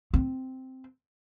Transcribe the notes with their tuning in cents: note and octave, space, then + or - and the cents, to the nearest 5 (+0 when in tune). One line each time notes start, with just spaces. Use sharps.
C4 -5